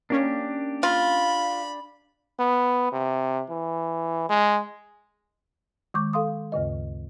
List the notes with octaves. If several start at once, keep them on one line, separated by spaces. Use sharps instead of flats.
A#3 C#4 D4 G4
F4 B5
B3
C3
E3
G#3
D#3 G#3 C#6 D6 G6
A4 F5 C6 D#6
D2 G2 C#3 D#5